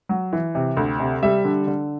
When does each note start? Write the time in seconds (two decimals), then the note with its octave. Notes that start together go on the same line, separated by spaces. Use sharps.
0.09 F#3
0.33 E3
0.55 C3
0.77 D2
1.00 C3
1.23 G3 E5
1.45 D3
1.67 D3